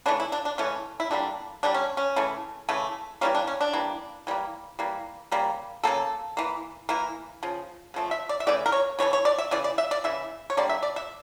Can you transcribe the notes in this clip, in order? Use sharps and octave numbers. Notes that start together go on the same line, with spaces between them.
C#3 E3 A3 D4
E4
D4
D4
C#3 E3 A3 C#4
E4
D3 G3 A#3 D4
D3 G3 A#3 D4
C#4
C#4
C#3 E3 A3
C#3 E3 A3
E3 G3 A#3 C#4
D4
C#4
D4
E3 G3 A#3
E3 G3 A#3
E3 G3 A#3
C#3 G3 A#3
C#3 G3 A#3 A4
E3 A#3
E3 A#3 A#4
C#3 F3
C#3 F3 A3
E5
D5
E5
C#3 E3 A3 D5
A#4
C#5
C#3 E3 A3 C#5
C#5
D5
E5
C#3 E3 D5
D5
E5
D5
C#3 E3 E5
C#5
D3 G3 A#3 D5
E5
D5
E5